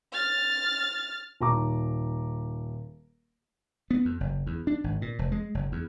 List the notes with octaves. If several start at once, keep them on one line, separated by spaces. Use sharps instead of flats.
F6 A6
D#1 A#5 D6
B3
F2
F#1
E2
D4
G#1
A#2
F1
G#3
F#1
E2